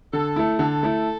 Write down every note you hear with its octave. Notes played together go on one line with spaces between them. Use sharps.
D3 A4
A3 E4
D3 A4
A3 E4